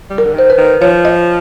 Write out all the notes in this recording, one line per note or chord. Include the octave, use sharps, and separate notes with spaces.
G3
A#4
D3
D#3 C5
B4
D#3
F3 C#5
D#5